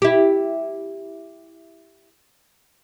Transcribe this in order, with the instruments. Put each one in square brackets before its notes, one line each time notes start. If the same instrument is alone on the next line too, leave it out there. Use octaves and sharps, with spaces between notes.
[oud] E4 G4